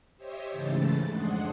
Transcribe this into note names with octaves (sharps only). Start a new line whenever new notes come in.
G4 C5 C#5 D#5 E5
G#2 C#3 E3 A3 A6
F2 G#3 D4 G#4 F#5 C6